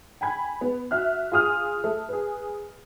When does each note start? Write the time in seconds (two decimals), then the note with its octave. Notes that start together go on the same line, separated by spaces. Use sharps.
0.21 G5 G#5 B5 G#6
0.61 B3
0.91 F#4 E5 F6 F#6
1.32 F4 G#4 D#6 F6
1.84 A3
2.09 G#4 B4